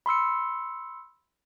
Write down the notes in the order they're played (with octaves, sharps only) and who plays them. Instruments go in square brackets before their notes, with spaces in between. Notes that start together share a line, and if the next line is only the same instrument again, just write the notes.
[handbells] B5 C6 E6 C#7